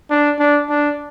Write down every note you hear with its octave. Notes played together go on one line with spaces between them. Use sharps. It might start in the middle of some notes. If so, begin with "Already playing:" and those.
D4
D4
D4